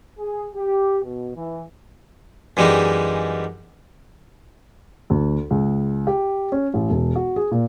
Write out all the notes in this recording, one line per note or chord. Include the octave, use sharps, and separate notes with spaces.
G#4
G4
B2
E3
F#2 E3 G3 G#3 D#4
D2
C#2
G4
C#4
A1
E1
F#4
G#4
A#2